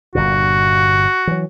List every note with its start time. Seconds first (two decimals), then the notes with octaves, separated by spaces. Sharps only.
0.15 G1 G2 A#2 F#4
1.27 E3 F#3